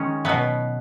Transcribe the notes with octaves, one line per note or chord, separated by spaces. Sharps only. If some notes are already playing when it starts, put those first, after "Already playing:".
Already playing: D#3 G#3 C#4
B2 F#3 B3